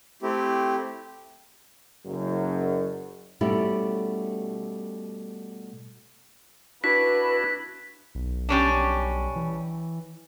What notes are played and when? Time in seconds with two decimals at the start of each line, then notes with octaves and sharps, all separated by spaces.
0.22 A3 C4 E4 G4
2.06 F#1 F#2
3.41 B2 G3 A3 C#4 E4 G4
6.84 D4 E4 F#4 B4 B6
8.15 B1
8.49 G3 C#4 D4
9.36 E3